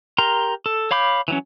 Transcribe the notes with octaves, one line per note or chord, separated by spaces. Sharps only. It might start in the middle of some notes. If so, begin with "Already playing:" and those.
G4 A#4 A#5 C6
A4
C#5 F5 B5 D6 G6
E3 F#3 C#4